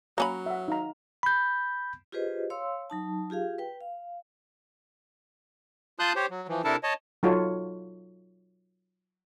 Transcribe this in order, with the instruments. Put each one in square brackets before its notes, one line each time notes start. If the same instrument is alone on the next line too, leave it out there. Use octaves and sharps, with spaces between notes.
[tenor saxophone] F#3 [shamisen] A#3 C#4 B5 [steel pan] A#5
[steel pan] E5 F#5
D#4 F5 A#5
[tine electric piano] B5 G6
[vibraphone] F4 G4 G#4 B4 C5 D#5
C#5 F5 C6 E6
F#3 D#4 A5
F4 G4 G#4 F5
B4 G5
F5
[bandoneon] F4 A5 C6 D#6 F#6 G6
G4 C5 C#5
F#3
E3 F3
C3 D4 E4 A4 A#4 A5
C#5 D#5 A5
[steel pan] F#3 D#4 F4 F#4 A4 C#5